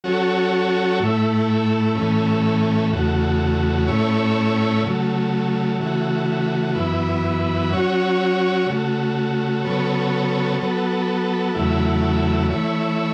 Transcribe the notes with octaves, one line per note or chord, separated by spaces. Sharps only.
F#3 C#4 F#4 A4 C#5
A2 A3 E4
A2 E3 A3 C#4
E2 C#3 A3 F#4
A2 A3 C#4 E4 C#5
C#3 F#3 A3
C#3 E3 A3 F#4
F#2 E3 B3 E4
F#3 C#4 F#4 C#5
C#3 A3 F#4
C#3 F#3 B3 A4 C#5
F#3 B3 A4
E2 C#3 F#3 A3 E4
E3 A3 E4 C#5